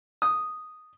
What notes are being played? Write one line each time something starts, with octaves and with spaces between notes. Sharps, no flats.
D#6